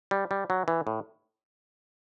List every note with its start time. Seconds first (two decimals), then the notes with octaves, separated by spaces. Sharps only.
0.11 G3
0.31 G3
0.50 F#3
0.68 E3
0.87 A2